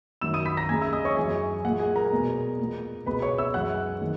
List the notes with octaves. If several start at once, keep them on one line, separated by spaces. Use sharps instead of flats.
F#2 D#3 F#3 E6 E7
D#6 D#7
B5 B6
A#5 A#6
D#2 C#3 G#3 G#5 G#6
E5 E6
D#5 D#6
C#5 C#6
F#2 E3 G#3 G#4 G#5
A#2 G#3 F#5
G#4 G#5
A#4 A#5
E2 B2 G#3
A#2 G#3
C#2 B2 G#3 B4 B5
C#5 C#6
E5 E6
F#2 E3 G#3 F#5 F#6
D#3 G#3